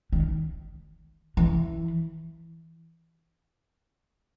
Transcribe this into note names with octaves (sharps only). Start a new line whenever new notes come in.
D#3
E3